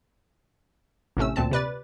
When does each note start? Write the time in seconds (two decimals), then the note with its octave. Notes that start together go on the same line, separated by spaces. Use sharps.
1.17 A1 A2 C3 A3 C#4 E6
1.36 D2 A#2 C4 A5
1.51 C3 B4 D5 A6